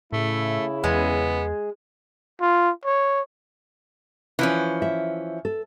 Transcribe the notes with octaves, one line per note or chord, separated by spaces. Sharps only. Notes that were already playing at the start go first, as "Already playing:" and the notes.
A2 C#3 A3 E4
E2 G#3 B3
F4
C#5
E3 F3 C#4
E5
A4